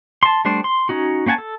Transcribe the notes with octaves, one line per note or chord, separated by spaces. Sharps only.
A5 C6
G3 A3 D4 C5
C6
C#4 D#4 F#4
A#3 C#4 F#5 G#5 A5
A4